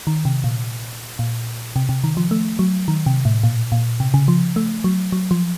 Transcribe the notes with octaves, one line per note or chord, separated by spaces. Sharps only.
D#3
C3
A#2
A#2
C3
C3
D#3
F3
A3
F#3
D#3
C3
A2
A#2
A#2
C3
C#3
F3
A3
F#3
F#3
F3